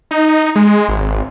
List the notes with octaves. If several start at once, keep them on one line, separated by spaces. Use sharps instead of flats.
D#4
G#3
G#1